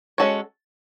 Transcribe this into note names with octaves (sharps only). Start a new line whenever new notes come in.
G#3 C#4 F#4 A4 C#5